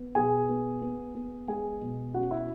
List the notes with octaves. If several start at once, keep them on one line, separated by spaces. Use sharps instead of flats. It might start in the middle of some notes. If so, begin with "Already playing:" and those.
Already playing: B3
B2 G#4 G#5
B3
B3
B3
G#3 G#4 G#5
B2
C#4 F#4 F#5
E4 E5